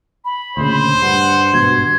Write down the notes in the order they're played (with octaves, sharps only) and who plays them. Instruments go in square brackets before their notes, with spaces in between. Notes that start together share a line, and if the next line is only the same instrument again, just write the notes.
[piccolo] B5
[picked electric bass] D2 A#2 C#3 [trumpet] C5
[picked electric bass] G2 [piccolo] F#5
[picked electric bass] G#1 G2 B2 [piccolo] G#6